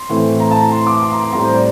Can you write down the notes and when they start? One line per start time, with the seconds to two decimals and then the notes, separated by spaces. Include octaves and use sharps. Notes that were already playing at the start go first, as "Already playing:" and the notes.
Already playing: C6
0.10 A2 E3 A3 C4
0.40 A#5
0.51 A5
0.61 A#5
0.71 C6
0.87 D6
1.03 C6
1.12 A#5
1.23 C6
1.33 A2 G3 C4 A#5
1.43 C5
1.54 D5